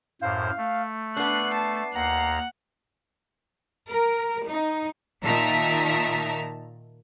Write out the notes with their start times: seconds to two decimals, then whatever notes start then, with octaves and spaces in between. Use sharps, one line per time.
0.21 F#2 A2 C5 F5
0.57 A3
1.17 B3 D4 F#6 C7
1.54 A5
1.94 D#2 F#5 A#5
3.91 A#4
4.48 D#4
5.24 A#2 D#3 E5 A5 A#5 B6